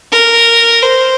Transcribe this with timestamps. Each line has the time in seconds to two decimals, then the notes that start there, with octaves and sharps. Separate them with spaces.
0.12 A#4
0.82 C5